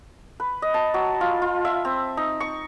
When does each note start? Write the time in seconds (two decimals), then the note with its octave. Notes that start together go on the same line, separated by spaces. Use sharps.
0.40 B4
0.62 D#5
0.74 A5
0.94 F#3
1.21 F4
1.42 F4
1.65 E5
1.85 C4
2.17 D#4
2.40 C#6